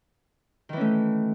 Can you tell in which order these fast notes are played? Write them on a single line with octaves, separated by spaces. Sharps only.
D#3 E3 C#4 A3